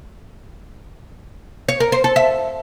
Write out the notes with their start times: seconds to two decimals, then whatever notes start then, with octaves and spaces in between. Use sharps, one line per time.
1.69 C#5
1.80 A#4
1.92 C5
2.04 A4
2.16 E5